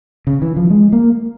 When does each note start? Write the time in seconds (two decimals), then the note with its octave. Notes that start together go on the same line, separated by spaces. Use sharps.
0.27 C#3
0.42 E3
0.56 F3
0.70 G#3
0.93 A#3